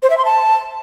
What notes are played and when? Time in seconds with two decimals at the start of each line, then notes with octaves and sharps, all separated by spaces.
0.03 C5
0.10 E5
0.18 C6
0.25 A5